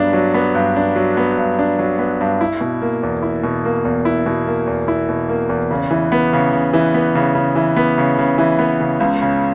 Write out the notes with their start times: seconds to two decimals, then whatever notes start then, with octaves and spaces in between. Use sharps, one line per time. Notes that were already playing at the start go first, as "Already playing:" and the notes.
Already playing: G2 F#3 B3 D4
0.13 F#3
0.34 B3
0.55 G2
0.76 D4
0.96 F#3
1.17 B3
1.37 G2
1.59 D4
1.79 F#3
1.99 B3
2.21 G2
2.41 E4
2.61 B2
2.82 A#3
3.03 E2
3.22 E4
3.43 B2
3.65 A#3
3.85 E2
4.05 E4
4.26 B2
4.47 A#3
4.67 E2
4.88 E4
5.09 B2
5.29 A#3
5.49 E2
5.71 C#3
5.91 E3
6.12 B3
6.33 C#3
6.53 C#3
6.73 E3
6.94 B3
7.15 C#3
7.35 C#3
7.56 E3
7.76 B3
7.98 C#3
8.18 C#3
8.38 E3
8.59 B3
8.80 C#3
9.00 C#2
9.22 C#3